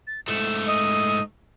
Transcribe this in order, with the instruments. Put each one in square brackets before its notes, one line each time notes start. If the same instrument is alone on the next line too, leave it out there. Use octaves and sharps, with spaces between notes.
[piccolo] A6
[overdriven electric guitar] G#2 A3 [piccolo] E7
[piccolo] D#5